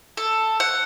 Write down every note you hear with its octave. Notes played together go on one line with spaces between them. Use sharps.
A4
F#5